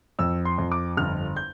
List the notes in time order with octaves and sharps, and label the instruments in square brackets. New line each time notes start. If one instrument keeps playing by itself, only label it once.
[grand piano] F2 E6
C6
F2
D6
G1 F6
G6